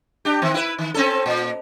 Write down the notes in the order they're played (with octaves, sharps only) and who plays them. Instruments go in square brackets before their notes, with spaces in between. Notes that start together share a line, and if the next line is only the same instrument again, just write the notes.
[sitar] D4 G4
D#3 C4
E4 B4
D#3
C4 C#4 A4
A#2